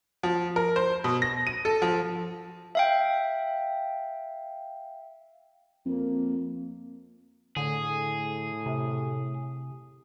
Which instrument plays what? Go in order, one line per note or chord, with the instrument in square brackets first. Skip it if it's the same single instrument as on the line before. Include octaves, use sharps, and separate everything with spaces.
[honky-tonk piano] F3
A#4
C5
B2
A#6
D#7
A4
F3
[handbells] E5 F5 G5
[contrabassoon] F2 [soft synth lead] A#3
[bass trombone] A2 [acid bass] D3 [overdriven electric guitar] G#4
[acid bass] C3